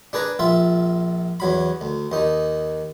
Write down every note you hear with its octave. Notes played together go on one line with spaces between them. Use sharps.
D4 G#4 B4 A#5
A#1 F4 E5
E2 F#3 B5
D2
D#2 D#4